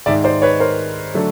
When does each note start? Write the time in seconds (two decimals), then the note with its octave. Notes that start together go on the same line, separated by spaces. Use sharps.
0.06 G#2 D#3 G#3 D5 E5
0.24 C5 D5
0.42 B4 C#5
0.60 A#4 C5
1.14 D3 F#3 A3 D4